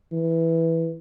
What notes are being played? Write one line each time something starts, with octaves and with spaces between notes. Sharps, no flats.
E3